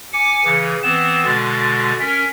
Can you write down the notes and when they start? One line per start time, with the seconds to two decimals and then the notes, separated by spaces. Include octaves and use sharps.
0.13 G#5 D6 C#7
0.44 C#3 E3
0.83 E3 B3 C4 E7
1.25 B2 D3 G#3 A6
2.00 C#4 A#4 B6